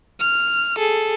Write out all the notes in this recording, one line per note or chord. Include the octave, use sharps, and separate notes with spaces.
F6
G#4 A4